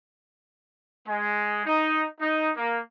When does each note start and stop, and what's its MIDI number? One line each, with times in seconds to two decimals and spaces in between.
1.08 1.63 56
1.66 2.05 63
2.21 2.51 63
2.57 2.78 58